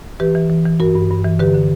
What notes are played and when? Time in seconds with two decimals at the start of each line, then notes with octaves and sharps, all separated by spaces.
0.20 E3 G4 B4
0.35 E3
0.50 E3
0.65 E3
0.80 G2 F#4 A#4
0.95 G2
1.10 G2
1.24 E3
1.39 D3 G4 B4
1.54 D3